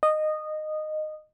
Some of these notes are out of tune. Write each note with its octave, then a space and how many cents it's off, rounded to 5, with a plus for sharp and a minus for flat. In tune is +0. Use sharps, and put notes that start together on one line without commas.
D#5 -15